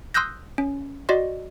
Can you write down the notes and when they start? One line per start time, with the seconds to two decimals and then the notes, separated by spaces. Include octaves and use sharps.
0.14 C6 D#6 E6 F#6 G6 A#6
0.58 C#4
1.09 F#4 D5 D#5 C6